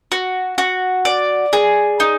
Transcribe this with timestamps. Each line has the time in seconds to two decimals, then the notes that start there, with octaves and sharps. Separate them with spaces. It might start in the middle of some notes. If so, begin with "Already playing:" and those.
0.12 F#4
0.58 F#4
1.05 D5
1.53 G#4
2.00 D#4